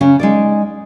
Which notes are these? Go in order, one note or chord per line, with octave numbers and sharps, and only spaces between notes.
C#3 C#4
G#3 D#4 D5